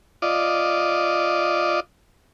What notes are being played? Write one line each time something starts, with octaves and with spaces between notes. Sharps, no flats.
F4 D5 D#5